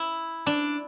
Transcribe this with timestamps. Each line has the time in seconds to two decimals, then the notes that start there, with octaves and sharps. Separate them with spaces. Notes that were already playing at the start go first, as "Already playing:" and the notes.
Already playing: E4
0.46 D4